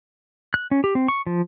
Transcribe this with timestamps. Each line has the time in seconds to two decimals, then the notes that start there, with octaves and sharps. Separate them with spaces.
0.54 F#6
0.71 C#4
0.84 G4
0.95 C4
1.08 C#6
1.27 F3